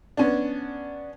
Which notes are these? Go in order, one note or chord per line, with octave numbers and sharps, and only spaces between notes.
B3 C#4 D4